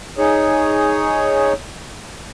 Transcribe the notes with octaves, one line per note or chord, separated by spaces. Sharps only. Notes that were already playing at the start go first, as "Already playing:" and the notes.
D#4 G#4 C#5